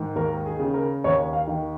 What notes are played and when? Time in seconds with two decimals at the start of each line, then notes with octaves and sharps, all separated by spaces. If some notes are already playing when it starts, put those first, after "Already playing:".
Already playing: G#2 D#3
0.15 D#2 A#4
0.46 G#4
0.59 C#3
0.74 A#4
1.04 D#2 C#5
1.33 F5
1.47 D#3